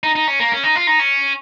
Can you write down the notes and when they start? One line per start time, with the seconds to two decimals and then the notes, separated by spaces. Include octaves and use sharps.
0.03 D#4
0.15 D#4
0.28 C#4
0.40 A#3
0.52 C#4
0.64 D#4
0.76 F4
0.87 D#4
1.00 C#4